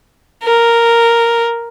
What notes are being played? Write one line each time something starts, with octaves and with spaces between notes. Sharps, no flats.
A#4